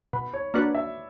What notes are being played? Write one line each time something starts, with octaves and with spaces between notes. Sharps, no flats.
B2 B5
C#5
A#3 D4 F#4 B4 D5
E5